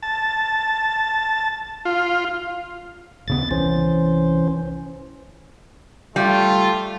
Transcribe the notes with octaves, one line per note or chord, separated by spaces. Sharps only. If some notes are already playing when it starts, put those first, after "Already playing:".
A5
F4
D#1 C#3 B3 A6
C2 E3 C#4 C5
G3 A3 F4